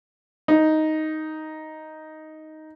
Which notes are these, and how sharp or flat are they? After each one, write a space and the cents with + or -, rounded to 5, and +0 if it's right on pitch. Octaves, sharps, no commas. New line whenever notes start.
D#4 +5